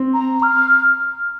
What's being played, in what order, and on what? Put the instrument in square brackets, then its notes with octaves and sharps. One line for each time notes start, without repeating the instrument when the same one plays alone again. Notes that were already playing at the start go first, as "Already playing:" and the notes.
Already playing: [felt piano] C4
[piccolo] A#5
F6